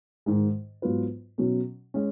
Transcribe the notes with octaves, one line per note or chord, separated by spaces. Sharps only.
G#2 D#3 G#3
G#2 F#3 B3 F4 B4
B2 F#3 C#4
G#3 C#4